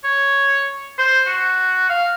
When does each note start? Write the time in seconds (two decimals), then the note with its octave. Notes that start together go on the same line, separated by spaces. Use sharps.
0.04 C#5
0.99 C5
1.26 F#4
1.89 F5